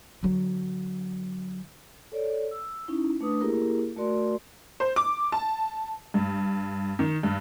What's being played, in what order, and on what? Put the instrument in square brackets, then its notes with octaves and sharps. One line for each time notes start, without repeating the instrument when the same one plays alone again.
[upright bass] D3 F#3
[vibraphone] A4 C#5 D5
E6
C#4 D#4 E4
A3 D4 B4 D#6
A#3 E4 G4 G#4 A#4
A3 F#4 A#4 D5 C6
[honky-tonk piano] C5
D6
A5
G2
D#3
G2